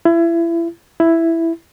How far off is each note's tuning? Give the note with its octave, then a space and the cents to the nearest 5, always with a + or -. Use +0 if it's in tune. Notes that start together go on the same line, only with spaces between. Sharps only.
E4 +30
E4 +5